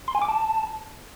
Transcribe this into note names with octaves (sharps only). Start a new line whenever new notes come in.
C6
G#5
D6
A5